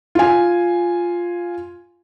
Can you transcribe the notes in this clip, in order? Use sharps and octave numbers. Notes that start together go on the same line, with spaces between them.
F4 G#5